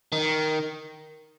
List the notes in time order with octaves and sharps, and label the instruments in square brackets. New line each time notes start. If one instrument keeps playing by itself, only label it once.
[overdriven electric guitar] D#3